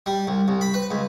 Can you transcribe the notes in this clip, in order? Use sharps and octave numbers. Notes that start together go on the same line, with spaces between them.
G3
C2
C2
B5
B4
C#2